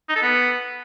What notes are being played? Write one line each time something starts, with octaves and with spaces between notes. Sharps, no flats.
D#4
A4
B3